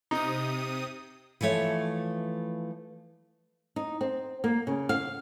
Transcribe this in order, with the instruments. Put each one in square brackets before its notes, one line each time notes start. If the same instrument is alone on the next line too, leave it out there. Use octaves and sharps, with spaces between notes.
[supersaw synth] C3 D#6 [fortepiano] D#4
[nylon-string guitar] E3 F3 A3 C#5 E5
D#4
C4
A#3
C#3
F5